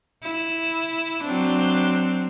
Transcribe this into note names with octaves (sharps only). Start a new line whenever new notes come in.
E4
F#3 C4 D4